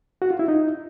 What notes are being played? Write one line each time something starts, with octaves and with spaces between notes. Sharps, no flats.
F#4
F4
E4
D#4